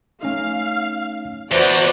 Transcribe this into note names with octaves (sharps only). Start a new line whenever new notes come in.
A3 C#4 D#4 F5
E2 F#4 B4 C5 D5